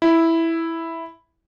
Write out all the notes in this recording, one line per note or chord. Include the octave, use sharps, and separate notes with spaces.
E4